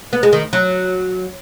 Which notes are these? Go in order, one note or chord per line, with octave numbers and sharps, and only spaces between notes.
B3
G#3
D#3
F#3